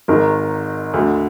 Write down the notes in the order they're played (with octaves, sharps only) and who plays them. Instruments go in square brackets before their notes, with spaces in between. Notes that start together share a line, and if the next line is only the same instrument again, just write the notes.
[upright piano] G#1 G#2 D#3 A#4
D2 D3